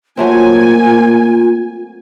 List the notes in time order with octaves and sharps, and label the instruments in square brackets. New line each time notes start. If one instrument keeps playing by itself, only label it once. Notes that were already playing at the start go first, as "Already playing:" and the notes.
[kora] F#3 A3 C4 [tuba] A#3 [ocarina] F4 [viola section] G#5